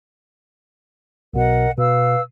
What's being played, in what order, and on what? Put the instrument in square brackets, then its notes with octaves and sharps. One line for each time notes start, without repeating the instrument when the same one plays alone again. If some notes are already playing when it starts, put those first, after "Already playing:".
[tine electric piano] B1 B2 [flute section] A#4 D#5 F#5
[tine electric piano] B2 [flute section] B4 F5 E6